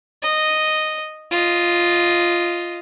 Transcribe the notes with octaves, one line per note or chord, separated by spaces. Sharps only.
D#5
F4 D#5